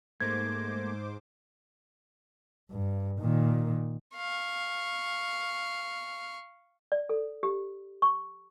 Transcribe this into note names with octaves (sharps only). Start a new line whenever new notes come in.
G#2 A3 A#3 C5 D6 G#6
G2
A#2 D#3
F5 C#6
D5
A4
G4
C#6